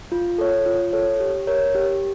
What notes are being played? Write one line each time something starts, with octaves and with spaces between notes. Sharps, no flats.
F4
A4 C#5
F4
A4 C#5
G4
A#4 C#5
G4